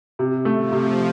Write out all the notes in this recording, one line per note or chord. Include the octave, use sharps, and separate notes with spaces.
C3
A3
F3
C3